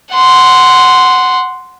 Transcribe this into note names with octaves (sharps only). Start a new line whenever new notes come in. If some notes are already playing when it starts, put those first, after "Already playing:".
F#5 C6